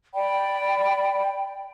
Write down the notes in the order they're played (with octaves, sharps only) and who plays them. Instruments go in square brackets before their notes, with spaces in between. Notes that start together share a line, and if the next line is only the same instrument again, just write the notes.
[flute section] D5 G5 B5